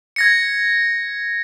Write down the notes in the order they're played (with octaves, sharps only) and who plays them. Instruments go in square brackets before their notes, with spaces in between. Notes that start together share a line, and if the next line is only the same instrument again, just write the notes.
[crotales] G#6 A#6 C#7